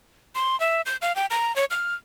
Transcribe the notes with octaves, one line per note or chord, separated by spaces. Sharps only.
C6
E5
G6
F5
G5
A#5
C#5
F6